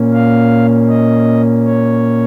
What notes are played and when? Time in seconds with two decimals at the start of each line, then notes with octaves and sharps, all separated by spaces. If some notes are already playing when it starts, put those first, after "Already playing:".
Already playing: A#2 A#3 C#4
0.13 F5
0.89 D#5
1.65 C#5